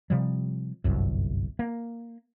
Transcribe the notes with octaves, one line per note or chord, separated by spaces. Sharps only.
C3 F3 G3
G1 C2 F#2
A#3